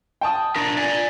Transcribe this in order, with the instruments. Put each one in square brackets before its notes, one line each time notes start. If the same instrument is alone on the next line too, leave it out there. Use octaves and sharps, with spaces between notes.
[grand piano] G5 A5 D#6
[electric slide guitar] D4 A#4 [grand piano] A6
[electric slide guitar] D5 G#5